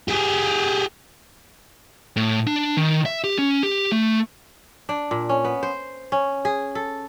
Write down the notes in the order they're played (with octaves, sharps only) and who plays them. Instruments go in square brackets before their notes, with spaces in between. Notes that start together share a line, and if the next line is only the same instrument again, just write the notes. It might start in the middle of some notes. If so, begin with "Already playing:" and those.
[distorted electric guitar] G4 G#4
[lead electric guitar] A2
D4
D#3
E5
G4
C#4
G4
A3
[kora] D4
A#2
C#4
B3
C5
C#4
G#4
A4